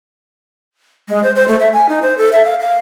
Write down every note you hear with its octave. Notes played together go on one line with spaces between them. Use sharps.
G#3
C5
C5
A3
E5
G#5
D#4
C5
A4
E5
F5
F5